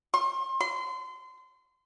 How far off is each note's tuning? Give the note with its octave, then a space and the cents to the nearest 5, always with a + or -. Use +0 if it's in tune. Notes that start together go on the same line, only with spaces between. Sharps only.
C6 +35
C6 -30